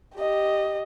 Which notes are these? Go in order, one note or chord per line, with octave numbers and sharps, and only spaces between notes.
G4 D#5